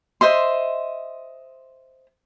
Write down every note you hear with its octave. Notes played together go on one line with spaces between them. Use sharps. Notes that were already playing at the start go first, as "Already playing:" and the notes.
C5 D#5 E5 C6